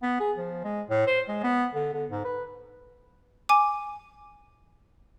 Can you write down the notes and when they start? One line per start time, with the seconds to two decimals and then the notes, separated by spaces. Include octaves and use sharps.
0.02 B3
0.20 G#4
0.38 F3
0.64 G#3
0.90 A2
1.07 C5
1.28 G#3
1.43 B3
1.74 D3
1.93 D3
2.10 G#2
2.24 B4
3.49 G#5 D6